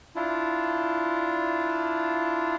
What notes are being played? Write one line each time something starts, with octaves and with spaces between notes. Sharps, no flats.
D4 E4 F4